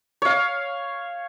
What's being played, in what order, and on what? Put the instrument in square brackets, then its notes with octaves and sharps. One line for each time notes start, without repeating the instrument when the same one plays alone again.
[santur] C#5 F5